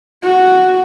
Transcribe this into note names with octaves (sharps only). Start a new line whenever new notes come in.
F#4